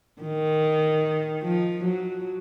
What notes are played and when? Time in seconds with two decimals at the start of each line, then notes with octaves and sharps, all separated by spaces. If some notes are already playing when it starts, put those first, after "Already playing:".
0.22 D#3
1.43 F3
1.83 F#3